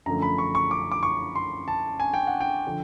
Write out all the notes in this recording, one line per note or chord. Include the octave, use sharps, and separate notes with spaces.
F#2 D3 F3 A3 A#5
B5
C#6
C#6
D6
D6
C#6
C6
A5
G#5
G5
F#5
G5
D3 F3